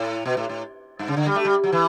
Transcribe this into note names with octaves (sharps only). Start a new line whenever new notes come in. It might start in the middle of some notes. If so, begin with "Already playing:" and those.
Already playing: A2
B2
A2
A2
G2
C#3
D3
G3
A3
G3
F#3
E3